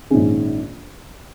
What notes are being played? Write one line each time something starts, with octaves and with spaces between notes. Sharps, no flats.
A#1 G#2 D#3 C#4 G#4